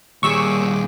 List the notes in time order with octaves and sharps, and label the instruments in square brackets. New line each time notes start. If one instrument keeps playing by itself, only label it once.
[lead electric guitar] D#2 A#2 [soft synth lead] G3 [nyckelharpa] G#4 D6 [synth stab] C#6 E6